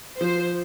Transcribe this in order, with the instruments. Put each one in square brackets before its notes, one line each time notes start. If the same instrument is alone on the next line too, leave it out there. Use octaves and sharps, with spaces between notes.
[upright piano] F3 [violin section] C5